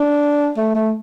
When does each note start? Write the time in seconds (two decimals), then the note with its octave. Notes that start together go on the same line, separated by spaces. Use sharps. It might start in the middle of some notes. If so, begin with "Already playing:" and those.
Already playing: D4
0.57 A3
0.75 A3